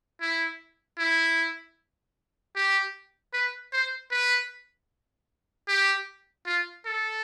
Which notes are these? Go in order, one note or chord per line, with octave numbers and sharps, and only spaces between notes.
E4
E4
G4
B4
C5
B4
G4
F4
A4